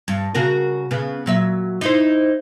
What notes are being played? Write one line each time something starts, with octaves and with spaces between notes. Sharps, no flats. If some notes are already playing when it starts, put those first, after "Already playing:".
G2
C#3 F#4 A#4
C#3 B3
A#2 F#3 E5
D#4 E4 C5